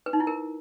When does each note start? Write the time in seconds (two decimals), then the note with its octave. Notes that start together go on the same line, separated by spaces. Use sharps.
0.06 B4
0.13 D#4
0.20 E4
0.27 A#4